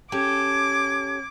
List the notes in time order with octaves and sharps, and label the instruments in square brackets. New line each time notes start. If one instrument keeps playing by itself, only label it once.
[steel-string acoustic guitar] C#4 G4 A4 [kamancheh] D6 [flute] G#6